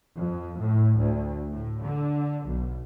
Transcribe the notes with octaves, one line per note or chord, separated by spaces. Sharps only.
F2
A2
D2
A2
D3
B1